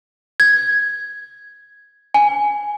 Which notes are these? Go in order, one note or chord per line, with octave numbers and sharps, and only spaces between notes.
G#6
G#5